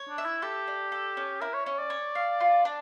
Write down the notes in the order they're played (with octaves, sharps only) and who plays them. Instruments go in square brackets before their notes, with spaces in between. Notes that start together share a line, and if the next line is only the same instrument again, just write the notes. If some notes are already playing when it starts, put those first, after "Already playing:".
Already playing: [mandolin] C#5
[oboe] D4
[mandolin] E5
[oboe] E4
[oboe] G4 [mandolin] A4
[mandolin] D4
A4
C#4
[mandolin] E4 [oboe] A#4
[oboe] C#5
[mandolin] C#4 [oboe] C#5
[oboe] D5
[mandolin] C#5
F5
F4
D4